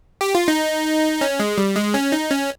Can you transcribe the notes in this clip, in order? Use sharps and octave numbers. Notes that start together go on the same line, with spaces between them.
G4
F4
D#4
C#4
G#3
G3
G#3
C#4
D#4
C#4